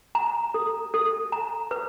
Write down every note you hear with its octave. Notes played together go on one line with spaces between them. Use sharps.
A#5
A4
A4
A#5
B4